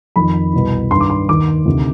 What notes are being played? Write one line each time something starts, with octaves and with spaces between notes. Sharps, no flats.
F2 D#3 B5
C2 B2
G2 D#3 C6
D6
C6
D#2 D#3 D6
D2 C3 D#3